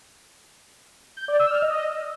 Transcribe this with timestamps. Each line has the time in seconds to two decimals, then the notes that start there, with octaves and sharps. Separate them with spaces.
1.17 G6
1.28 D5
1.40 E6
1.51 F6
1.62 D#5